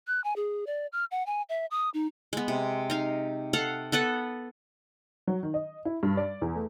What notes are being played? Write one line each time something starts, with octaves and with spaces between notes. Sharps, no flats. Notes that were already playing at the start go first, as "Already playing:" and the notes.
F#6
G#5
G#4
D5
F6
F#5
G#5
E5
D#6
D#4
G#3 B3
C3
D#4 F5
A4 F5 F#5
B3 A4 B4 F#5
F#3
D#3
D#5
E4
G2
D5
E2
A3